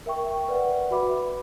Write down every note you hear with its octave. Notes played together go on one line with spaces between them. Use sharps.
A#4 E5 G5 C#6
B4 D5 F#5
F#4 B4 E5 B5 D6